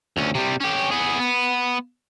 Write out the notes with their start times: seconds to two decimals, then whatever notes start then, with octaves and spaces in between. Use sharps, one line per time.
0.17 D2 C#4
0.35 C3 G3
0.61 C#4 G4
0.92 B3 G#4
1.20 B3